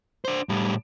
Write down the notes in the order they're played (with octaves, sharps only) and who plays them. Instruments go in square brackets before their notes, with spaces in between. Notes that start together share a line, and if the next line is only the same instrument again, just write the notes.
[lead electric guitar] D4 C5
A2 G3